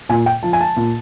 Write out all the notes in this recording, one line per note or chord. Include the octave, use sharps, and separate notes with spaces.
A#2 G#5
G5
F3 A5
G#5
A5
A#2